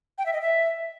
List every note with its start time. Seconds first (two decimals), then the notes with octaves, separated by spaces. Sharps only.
0.18 G5
0.26 E5
0.33 D#5
0.41 E5